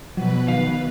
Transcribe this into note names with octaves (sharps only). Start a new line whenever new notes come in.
B2 F3 F#3 B4
D#3 F5